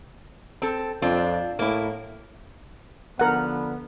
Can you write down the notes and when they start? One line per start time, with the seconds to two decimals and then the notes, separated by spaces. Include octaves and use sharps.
0.62 C4 A4
1.02 F2 C4 D4 F4
1.59 A2 A#3 E4
3.19 D3 F3 B3 A#4 F#5